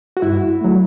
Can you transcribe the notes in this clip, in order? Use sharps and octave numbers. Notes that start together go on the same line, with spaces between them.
F#4
G2 E4
F#3 A3